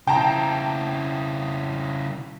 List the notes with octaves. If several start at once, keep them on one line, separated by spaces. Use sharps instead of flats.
C#3 E4 G5 A5 A#5